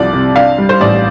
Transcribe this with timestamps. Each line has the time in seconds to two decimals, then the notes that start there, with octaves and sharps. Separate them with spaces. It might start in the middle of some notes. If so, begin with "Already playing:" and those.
Already playing: C2 F3 D5
0.13 C3
0.36 D4 F5
0.58 G3
0.69 C5
0.81 A1 D5